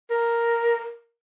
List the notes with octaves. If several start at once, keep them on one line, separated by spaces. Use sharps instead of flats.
A#4